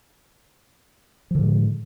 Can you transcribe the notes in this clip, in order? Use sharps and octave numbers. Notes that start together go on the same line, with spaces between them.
A2 D3 F3 G#3